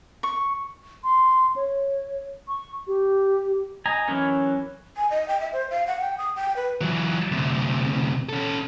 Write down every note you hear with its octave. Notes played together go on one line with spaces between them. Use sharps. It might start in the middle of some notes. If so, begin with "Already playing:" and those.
C#6
C6
C#5
C#6
G4
D#5 G#5 A#5
E3 F#3 C#4 A#4 C#5
G#5
D#5
G5
E5
C5
F5
F#5
G5
D#6
G5
B4
E3 F#3
D2 C3
C#4 A4